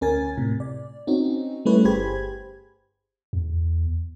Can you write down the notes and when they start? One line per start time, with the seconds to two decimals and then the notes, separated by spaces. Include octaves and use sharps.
0.01 D2 C#4 A#4 G#5 A6
0.38 A2 C3
0.60 D5
1.07 C4 C#4 D#4 F#4
1.65 G3 A3 C#4 E4 B4 C#5
1.85 G1 G4 G#4 C5 B5 G#6
3.33 E2